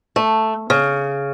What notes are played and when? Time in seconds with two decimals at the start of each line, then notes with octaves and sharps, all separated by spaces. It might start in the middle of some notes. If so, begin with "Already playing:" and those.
0.16 A3
0.70 C#3